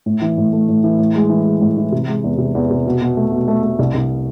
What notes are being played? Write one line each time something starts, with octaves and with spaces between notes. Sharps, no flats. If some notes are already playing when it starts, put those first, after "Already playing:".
A2
E3
A2
A3
A2
E3
A2
G#3
E3
G#3
A2
E3
C3
G#3
E2
C3
E2
C3
B2
B2
A3
B2
A3
A3
C2
C2